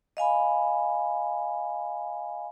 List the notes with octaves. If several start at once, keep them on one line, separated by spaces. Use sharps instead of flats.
D#5 F5 G#5 B5